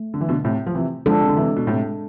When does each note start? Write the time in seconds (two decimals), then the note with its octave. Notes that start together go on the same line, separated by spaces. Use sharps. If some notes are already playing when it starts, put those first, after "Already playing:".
Already playing: A3
0.14 D3
0.21 E3
0.29 B2 D3
0.44 A2 C3
0.66 F3
0.75 C3 E3
1.06 D3 F3 G#3 D4 A4
1.21 C3
1.29 D3
1.36 C3 E3
1.57 B2
1.67 A2 C3